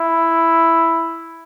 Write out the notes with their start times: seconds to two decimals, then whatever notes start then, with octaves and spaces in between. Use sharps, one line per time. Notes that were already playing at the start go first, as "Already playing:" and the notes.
Already playing: E4